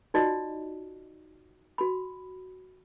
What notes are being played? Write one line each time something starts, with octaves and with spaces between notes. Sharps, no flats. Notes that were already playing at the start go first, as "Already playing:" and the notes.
D#4 F4 F#4 D5 D#5
F#4 B5